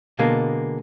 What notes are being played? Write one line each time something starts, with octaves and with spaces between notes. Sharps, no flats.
B2 D3 G#3 A#3